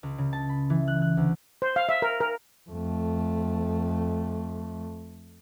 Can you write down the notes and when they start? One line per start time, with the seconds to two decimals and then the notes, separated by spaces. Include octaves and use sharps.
0.03 C#2
0.18 C#3
0.33 A5
0.49 B5
0.70 E3
0.88 F#6
1.02 F#6
1.17 D2
1.62 C5
1.76 F5
1.89 E5
2.02 A#4
2.21 A#4
2.70 F2 A3